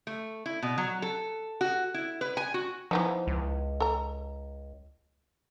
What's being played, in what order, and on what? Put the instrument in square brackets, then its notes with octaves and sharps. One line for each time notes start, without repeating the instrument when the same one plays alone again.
[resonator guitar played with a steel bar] A3
E4
B2
F#3
A4
F#4
E4
B4
G#5
F#4
[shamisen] E3 B3 D#4 [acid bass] F3
[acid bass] C#2
[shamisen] A4 A#5